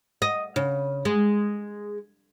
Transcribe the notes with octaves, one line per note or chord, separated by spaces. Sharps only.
D#5
C#3
G#3